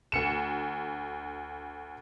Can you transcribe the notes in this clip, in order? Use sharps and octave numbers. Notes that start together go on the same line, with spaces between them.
D2 C#7 E7